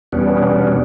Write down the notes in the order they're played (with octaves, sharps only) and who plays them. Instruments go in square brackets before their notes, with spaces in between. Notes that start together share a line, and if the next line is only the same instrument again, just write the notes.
[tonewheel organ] E2 B2 G3 B3 C#4 D4